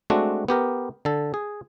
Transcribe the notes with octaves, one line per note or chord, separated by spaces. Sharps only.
G#3 A3 C4 D4 F#4
B3 G4 A#4
D3 A4
G#4